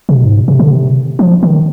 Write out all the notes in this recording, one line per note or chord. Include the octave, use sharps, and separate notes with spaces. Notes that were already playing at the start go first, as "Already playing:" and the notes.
C3
B2
G#2
C3
D3
C3
F3
D#3